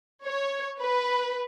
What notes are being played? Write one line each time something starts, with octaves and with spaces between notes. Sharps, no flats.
C#5
B4